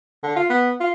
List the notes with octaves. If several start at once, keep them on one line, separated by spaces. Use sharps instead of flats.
D3
F4
B3
F4